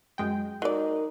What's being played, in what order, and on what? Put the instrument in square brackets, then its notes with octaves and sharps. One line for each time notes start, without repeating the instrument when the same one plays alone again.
[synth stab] F#2 G#3 G5
[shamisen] F#3 D5 [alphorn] D#4 [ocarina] A#4